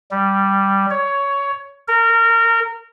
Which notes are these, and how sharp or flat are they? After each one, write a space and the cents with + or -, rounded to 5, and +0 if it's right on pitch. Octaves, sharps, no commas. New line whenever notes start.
G3 +0
C#5 +15
A#4 -25